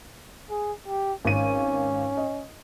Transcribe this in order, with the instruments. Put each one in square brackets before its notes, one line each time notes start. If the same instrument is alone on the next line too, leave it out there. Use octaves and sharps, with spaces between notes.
[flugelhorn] G#4
G4
[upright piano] G#1 D#7 [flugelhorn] C#4
[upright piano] D#5